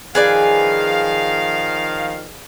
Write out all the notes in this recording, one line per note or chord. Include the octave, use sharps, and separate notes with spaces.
D#3 F3 G#4 B4 D5 F5